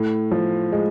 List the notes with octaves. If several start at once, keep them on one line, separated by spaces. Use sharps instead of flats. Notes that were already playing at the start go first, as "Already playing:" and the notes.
Already playing: A2
F3
G#3